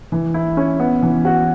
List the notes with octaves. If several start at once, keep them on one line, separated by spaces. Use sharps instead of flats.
E3
E4
C#4
B3
E3
F#4